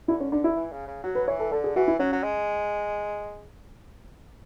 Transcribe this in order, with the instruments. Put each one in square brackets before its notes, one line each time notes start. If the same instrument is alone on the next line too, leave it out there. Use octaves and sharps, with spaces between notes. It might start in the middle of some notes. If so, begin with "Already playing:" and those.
[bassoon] D3 [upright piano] E4
[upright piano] C#4
[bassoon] D3 [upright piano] D4
[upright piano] E4
[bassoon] E3
C#3
C#3
[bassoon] F#3 [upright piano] F#4
[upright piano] B4
[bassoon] E3 [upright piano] C#5
[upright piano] A4
[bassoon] D3 [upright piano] A4
[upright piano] G#4
[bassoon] E3 [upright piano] F#4
[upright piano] E4
[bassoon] F#3 [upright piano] C#4
[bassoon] F#3
G#3